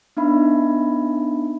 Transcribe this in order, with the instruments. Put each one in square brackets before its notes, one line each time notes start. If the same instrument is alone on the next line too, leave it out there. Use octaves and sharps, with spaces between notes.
[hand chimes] B3 D4 D#4 E5 B5